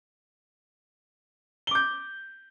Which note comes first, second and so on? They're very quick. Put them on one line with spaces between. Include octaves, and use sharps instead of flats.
G7 D6 G6